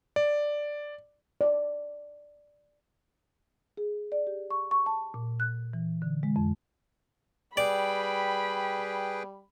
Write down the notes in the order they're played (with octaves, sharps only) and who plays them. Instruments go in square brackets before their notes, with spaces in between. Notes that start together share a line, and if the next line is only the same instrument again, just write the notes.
[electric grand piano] D5
[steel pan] D5
[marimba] G#4
D5
G4
C#6
C#6
A5
A#2
F#6
E3
D3
G#3
F2
[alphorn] G3 [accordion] G#4 B4 G5 [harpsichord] D5 [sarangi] B5